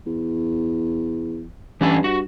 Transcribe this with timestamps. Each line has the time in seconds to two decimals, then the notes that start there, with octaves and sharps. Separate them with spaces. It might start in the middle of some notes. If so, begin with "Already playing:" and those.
0.06 E2
1.81 G2 E3 C#4 A5
2.04 F#4